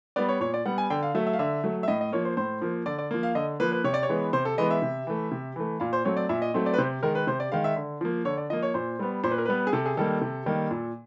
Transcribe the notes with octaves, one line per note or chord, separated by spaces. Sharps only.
G3 B3 D5
C#5
A#2 C#5
D5
G3 B3 F#5
G#5
D3 G5
F5
F#3 A3 E5
E5
F5
D3 E5
F#3 A3
E5
A2 D#5
D#5
F3 A#3 C#5
C5
A2 C5
F3 A#3
D3 D5
D5
F3 A#3
F5
D3 D#5
F3 A#3 B4
B4
C3 C#5
D5
C#5
E3 G#3 B3
C3 C5
A4
E3 G#3 B3 D#5
E5
C3
E3 A3
C3
E3 A3
A#2 F5
C5
F#3 A3 C4 C#5
D5
A#2 E5
D#5
F#3 A3 C4
D5
B4
C3 C5
D#3 G#3 A#4
B4
C3 C5
D5
D#3 G#3 F5
E5
D3
F3 A#3
D3 C#5
D5
F3 A#3 D#5
C#5
A#2 C5
G3 B3
A#2 C5
B4
A#4
G3 B3 B4
G#4
C3 A4
G#4
D#3 G3 A#3 A4
C3
D#3 G3 A#3
A#2